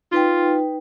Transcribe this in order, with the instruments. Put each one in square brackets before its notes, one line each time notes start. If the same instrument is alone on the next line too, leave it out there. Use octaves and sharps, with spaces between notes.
[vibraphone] D#4 B4 G5 [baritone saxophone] F4